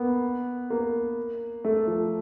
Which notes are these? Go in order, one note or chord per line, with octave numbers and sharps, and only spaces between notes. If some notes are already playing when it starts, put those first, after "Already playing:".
Already playing: A#3 B3
A#3
A3
F3